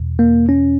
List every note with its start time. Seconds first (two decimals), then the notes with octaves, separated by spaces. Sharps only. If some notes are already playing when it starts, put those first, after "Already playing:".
Already playing: E2 B2
0.19 A#3
0.49 C#4